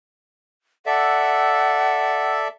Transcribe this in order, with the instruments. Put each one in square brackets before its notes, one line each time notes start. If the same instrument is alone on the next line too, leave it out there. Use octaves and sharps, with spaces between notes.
[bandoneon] A4 D5 E5 [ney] F#5